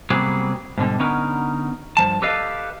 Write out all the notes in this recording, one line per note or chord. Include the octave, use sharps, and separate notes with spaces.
C3 F#3 G3 A#3 B3 G#4
G#2 B2 D3 G3
D3 B3 C#4 D#4 A#4
G2 F3 A5
G4 A4 B4 D5 D#5 F5